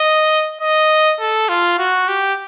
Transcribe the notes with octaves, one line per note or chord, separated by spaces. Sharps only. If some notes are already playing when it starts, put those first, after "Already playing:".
Already playing: D#5
D#5
A4
F4
F#4
G4